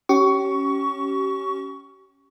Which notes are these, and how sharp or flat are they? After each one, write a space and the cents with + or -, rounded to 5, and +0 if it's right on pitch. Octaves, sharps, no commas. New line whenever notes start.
C#4 +0 G4 -35 C#6 +15